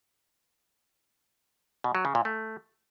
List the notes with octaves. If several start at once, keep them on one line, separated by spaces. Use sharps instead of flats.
B2
F#3
C#3
A#2
A3